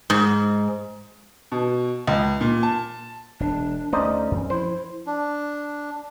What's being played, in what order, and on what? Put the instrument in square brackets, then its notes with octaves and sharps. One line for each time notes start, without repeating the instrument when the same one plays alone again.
[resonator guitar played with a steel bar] G#2
[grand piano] B2
C#2
A#2
A5
[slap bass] E1 [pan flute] D4
[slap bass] D2 A3 [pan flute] C#4 [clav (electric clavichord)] D#4 C5 D5
[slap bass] F#2 E3 C4
[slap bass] F3 [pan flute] E4 [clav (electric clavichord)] C5
[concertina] D4